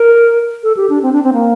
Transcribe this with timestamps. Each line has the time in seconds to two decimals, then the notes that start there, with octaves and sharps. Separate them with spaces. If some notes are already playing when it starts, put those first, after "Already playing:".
Already playing: A#4
0.63 A4
0.77 G4
0.90 D4
1.03 C4
1.13 D4
1.24 C4
1.33 A#3